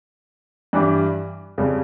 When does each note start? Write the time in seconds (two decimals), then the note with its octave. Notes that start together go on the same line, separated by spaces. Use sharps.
0.73 G2 E3 G3 D4 G4
1.58 F2 C#3 G3